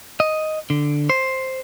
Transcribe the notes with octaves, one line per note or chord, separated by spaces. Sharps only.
D#5
D3
C5